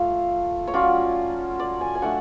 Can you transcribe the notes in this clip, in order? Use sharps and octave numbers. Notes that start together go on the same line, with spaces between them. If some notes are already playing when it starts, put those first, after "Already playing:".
Already playing: A3 F4 F5
C#5
F#3 C#4 F4 D5
D5
G#5
G#5
F#3 A3 D4 F#5